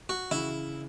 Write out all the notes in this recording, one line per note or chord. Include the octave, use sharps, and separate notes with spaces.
F#4
C#3 E3 E4